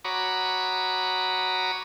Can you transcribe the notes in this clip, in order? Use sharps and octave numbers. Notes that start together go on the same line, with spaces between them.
F#4 C#5 A#5 B5 D6 D#6